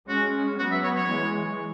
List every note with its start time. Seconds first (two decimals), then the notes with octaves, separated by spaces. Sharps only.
0.09 G#3 C#4 F#4
0.59 F#3 B3 F#4
0.71 E5
0.84 C#5
0.96 C#5
1.09 E3 G#3